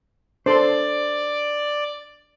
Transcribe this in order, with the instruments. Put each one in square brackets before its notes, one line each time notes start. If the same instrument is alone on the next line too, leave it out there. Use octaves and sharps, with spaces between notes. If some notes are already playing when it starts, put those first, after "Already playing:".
[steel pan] D4 A4 C6 [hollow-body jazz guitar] C5 [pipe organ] D5